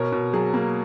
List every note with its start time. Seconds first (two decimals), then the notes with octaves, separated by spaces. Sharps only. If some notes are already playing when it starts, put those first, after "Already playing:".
Already playing: B2 A#4 C#5
0.12 B2
0.34 F#3 G#4
0.54 A#3